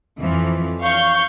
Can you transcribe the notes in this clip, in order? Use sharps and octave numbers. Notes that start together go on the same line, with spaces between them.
F2 E3 F3
F5 C#6 G6